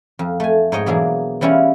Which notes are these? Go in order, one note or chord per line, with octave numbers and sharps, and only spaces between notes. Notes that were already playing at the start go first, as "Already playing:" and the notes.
F2
A3 G#5
G#2 C#5 D#5 G5
B2 E3 F#3 A#3 D4 G#4
E3 G3 C#4 E4 F4